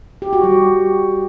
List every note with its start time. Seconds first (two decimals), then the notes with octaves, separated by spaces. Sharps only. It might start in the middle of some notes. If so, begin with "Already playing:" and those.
0.22 G4
0.33 F#4
0.44 G3